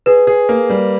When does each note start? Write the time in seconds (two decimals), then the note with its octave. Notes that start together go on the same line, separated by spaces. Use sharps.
0.06 G#4 B4
0.27 G#4
0.49 A#3
0.70 G3